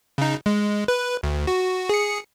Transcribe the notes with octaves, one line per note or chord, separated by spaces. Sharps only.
C#3 D#4
G#3
B4
D2
F#4
G#4 C#7